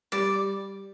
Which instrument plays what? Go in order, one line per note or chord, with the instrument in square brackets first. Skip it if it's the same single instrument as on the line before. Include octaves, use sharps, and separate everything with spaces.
[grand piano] G3 [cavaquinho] D5